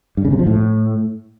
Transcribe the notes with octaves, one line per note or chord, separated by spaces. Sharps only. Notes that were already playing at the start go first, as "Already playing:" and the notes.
G2
C#3
C3
F3
A2